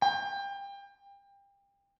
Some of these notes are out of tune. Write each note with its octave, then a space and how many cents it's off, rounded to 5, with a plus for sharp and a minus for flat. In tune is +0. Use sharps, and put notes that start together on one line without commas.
G5 +30